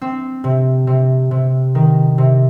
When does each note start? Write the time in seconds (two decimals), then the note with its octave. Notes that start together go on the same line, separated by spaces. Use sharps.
0.01 C4
0.44 C3
0.87 C3
1.31 C3
1.75 D#3
2.18 C3